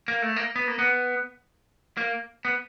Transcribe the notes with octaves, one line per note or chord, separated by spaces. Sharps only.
A#3
A3
A#3
B3
A#3
B3
A#3
B3